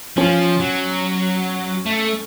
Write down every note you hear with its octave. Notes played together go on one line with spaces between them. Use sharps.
F3 C#4
F#3
A3